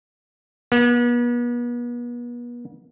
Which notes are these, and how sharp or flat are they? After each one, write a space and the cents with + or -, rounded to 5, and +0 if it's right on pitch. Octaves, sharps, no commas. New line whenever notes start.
B3 -40